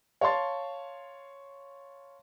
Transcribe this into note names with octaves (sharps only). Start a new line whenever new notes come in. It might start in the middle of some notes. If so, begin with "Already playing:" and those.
C#5 F5 A5 C6 A6